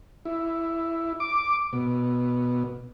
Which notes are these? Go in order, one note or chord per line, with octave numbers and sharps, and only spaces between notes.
E4
D6
B2